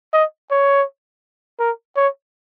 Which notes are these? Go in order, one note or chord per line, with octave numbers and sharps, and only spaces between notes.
D#5
C#5
A#4
C#5